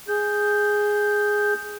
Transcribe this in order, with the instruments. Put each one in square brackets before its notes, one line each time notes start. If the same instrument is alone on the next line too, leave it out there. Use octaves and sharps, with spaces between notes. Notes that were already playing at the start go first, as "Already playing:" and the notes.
[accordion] G#4 G6